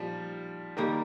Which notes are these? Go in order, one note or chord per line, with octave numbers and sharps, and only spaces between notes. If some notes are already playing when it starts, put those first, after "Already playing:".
Already playing: A#2 F3 G3 D#4
D#3 G3 A#3 D#4